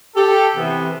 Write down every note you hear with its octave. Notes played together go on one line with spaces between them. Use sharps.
G4 A4
C3 E3 B3